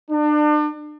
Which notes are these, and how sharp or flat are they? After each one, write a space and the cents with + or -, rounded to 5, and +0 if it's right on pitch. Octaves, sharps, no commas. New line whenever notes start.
D4 +35